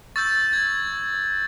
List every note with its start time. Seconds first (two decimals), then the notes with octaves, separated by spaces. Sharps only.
0.16 C#6 E6 G6 A6
0.53 G#6